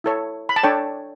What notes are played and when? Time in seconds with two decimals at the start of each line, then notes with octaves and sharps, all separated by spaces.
0.04 E4 A4 C#5
0.49 B5
0.56 A5
0.63 D4 A4 C#5 G5